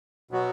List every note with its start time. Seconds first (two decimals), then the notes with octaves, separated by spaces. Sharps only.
0.31 B2 F#3 B3 F#4